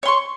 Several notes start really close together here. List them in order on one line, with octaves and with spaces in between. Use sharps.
C#5 C6 C#6